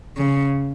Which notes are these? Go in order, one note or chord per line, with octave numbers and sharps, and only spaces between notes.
C#3